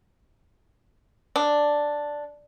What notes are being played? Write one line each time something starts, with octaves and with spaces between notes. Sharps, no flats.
D4